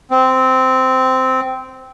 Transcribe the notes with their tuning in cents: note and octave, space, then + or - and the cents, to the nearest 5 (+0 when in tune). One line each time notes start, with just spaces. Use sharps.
C4 -10